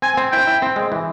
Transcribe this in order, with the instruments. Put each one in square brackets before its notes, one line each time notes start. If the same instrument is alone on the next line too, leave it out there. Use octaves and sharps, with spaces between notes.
[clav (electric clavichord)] C4 [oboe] G#5
[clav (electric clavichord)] C4
[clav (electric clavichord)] E4 [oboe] G5
[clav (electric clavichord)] E4
C4
G#3
E3